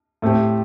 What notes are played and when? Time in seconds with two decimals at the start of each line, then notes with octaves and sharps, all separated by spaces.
0.22 A2 A3 C4 G4